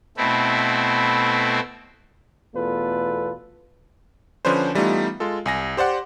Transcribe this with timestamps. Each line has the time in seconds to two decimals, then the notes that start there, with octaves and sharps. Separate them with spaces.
0.17 B2 A3 C4 E4
2.55 E2 B2 A3 F4 A4 B4
4.45 D3 F3 C#4 D4 B4 C5
4.75 E3 G3 A3 B3 D#4 F4
5.20 G#3 F4 A4
5.46 C2 G#5 A#6
5.77 G4 C5 D5 F#5 C6